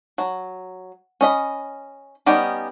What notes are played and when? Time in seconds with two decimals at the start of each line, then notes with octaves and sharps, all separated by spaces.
0.18 F#3
1.21 C#4 D#5 B5
2.26 G3 B3 C#4 D#4 G4